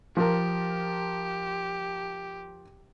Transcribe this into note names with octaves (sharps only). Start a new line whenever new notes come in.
F3 G4 A#4